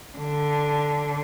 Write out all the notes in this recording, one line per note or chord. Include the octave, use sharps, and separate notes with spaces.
D3